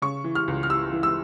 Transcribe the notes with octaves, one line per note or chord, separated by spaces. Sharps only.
C#3 C#6
E3
F6
C#2
F6
E3 E6
E3
E6